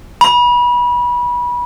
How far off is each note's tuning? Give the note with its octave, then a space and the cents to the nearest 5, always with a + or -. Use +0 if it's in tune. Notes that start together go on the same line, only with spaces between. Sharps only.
B5 -25